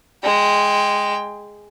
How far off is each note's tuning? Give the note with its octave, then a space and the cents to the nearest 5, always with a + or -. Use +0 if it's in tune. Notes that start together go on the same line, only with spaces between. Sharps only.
G#3 +0 G5 +20